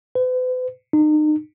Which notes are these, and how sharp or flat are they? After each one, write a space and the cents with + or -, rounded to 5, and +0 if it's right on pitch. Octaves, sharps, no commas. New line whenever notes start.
B4 +45
D#4 -35